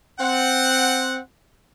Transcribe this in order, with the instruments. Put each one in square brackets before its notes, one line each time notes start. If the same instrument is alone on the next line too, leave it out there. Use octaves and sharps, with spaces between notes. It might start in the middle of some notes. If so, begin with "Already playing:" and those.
[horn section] C4 F#5